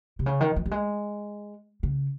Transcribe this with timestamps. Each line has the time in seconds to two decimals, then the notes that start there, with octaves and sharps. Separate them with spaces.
0.19 C3
0.26 C#3
0.40 D#3
0.56 F3
0.66 G3
0.71 G#3
1.83 C#3